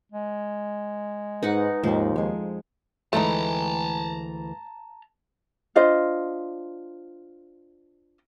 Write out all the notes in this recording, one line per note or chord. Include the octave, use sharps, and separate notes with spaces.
G#3
G#2 D#4 B4 F#5
D#2 G#2 D#3 F3
F2 G#3
D2 E3 G#3 A3 D#4 A5 A#5
D4 F4 C5 D#5